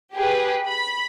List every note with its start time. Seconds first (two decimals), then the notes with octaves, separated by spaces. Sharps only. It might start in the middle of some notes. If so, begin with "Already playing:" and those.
0.14 G4 G#4 B4
0.67 B5